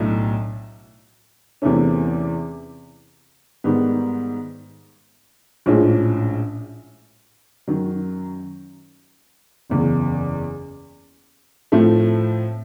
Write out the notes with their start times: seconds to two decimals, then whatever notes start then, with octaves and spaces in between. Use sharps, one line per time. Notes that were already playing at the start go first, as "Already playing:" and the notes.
Already playing: B1 A2 F#3 A3 D4
1.62 E2 C3 E3 A3 C#4
3.64 G#2 D#3 G3 B3
5.66 A#1 A2 F3 G#3 C#4
7.68 F#2 D#3 F#3
9.70 F#1 E2 C#3
11.72 A2 F3 A3 C4